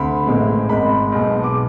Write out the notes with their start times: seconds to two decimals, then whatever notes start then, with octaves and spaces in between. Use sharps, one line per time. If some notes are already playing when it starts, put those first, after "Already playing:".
Already playing: D2 C3 B5
0.27 A1 A2 G#3 C4
0.69 G#1 G#2 G#3 B5
1.12 B1 B2 G#3
1.43 D6